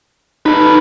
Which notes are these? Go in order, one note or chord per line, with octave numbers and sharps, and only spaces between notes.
D#4 A4 B4